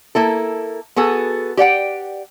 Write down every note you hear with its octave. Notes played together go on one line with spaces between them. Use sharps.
A#3 E4 A4
B3 F#4 G#4 A4
G4 D5 F#5 G5